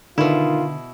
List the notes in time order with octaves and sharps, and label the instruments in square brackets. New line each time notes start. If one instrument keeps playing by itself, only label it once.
[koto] B2 E4 [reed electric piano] D3 [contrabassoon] D#3 [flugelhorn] F4